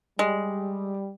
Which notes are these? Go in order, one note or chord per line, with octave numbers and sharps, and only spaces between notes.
G3 G#3